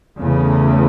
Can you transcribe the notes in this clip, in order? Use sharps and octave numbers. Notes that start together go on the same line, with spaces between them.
E2 C#3 A3